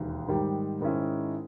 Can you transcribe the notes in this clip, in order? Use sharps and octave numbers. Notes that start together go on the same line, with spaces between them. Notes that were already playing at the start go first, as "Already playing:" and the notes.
Already playing: E1 D#2
G#2 D#3 G3
G#2 D#3 G#3 C#4 E4